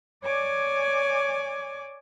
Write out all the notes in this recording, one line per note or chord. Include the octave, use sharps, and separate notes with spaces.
C#5 D5 G#5 D6